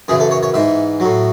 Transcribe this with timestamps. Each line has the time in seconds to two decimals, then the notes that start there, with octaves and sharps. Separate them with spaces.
0.08 F#2 C#3 E3 G#4
0.20 A4
0.31 C#5
0.43 C#5
0.54 G#2 E3 E5
1.00 A2 F#3